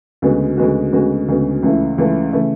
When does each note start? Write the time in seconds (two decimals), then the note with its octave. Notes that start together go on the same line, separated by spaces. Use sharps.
0.22 D2 C#3 G#3 B3 F#4
0.57 D2 C#3 G#3 B3 F#4
0.93 D2 C#3 G#3 B3 F#4
1.28 D2 C#3 G#3 B3 F#4
1.63 C#2 C#3 E3 A3 E4
1.98 C#2 C#3 E3 A3 E4
2.33 C#3 E3 A3 E4